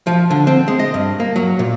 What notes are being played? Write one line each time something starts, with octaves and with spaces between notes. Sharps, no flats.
F3
D3
C4
G#3
D#5
G2
A#3
F#3
A#2